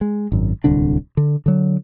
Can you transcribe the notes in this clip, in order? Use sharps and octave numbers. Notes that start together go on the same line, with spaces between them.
G#3
G#1 F#2
D1 C2 D3 D4
D3
D3 F#3